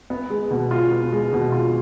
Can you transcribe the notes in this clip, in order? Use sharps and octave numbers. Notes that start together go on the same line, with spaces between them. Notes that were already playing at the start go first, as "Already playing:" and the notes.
B3
G#3
B2
F4
B3
G#3
B2
F4